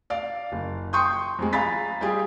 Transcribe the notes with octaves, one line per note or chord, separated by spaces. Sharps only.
D5 F5
F#1
G5 C6 C#6 D#6 G6
F2 G#3
F5 G#5 A#5 B5 A6 B6
G3 F4 G4 G#4